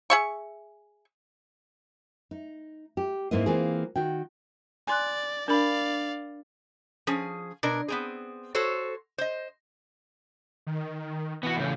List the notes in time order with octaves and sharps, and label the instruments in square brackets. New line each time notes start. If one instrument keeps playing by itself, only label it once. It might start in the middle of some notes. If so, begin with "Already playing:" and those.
[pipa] G#4 E5 C#6
[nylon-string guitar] D#4
G4
G#2 A#3 C4 E4 B4 D#5
E3 A#3 C4 F4 G#4
D#3 F#4 G5
[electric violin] D5 [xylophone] G#5 C6 F#6
[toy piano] D4 [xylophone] A#4 B5 [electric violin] D5 F5
[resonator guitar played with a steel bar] F3 C#4 G#4
B2 D4 A#4
B3 C4 G#4
F#4 A4 C5 C#5
C5 D#5
[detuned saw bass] D#3
[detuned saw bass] E3 [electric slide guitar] B3 F#4
[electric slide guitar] A2 C#3